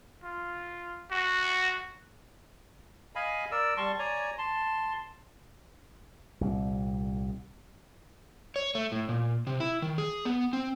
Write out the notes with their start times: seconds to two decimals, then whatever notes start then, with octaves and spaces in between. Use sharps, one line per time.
0.23 F4
1.11 F#4
3.15 D#5 F5 G#5 B5
3.51 A#4 D5 E6
3.77 G3 A5 C6 C#6
3.99 C#5 D5 G#5 A#5
4.38 A5 C6
6.41 C2 A#2
8.56 C#5
8.75 A3
8.92 A2
9.09 A#2
9.47 C3
9.60 E4
9.82 D#3
9.98 G#4
10.25 B3
10.53 C4